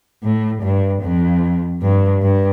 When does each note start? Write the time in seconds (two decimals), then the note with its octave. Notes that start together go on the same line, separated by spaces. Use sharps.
0.23 A2
0.63 G2
1.03 F2
1.82 G2
2.22 G2